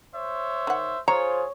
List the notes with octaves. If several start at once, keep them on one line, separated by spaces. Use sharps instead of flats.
C5 C#5 E5
D#3 F#5
F4 G#4 C5 C#5 A#5